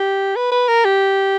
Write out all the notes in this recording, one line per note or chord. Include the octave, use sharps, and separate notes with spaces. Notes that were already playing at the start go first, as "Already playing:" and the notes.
Already playing: G4
B4
B4
A#4
G4